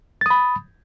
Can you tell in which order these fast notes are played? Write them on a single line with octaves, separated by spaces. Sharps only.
A6 D#6 B5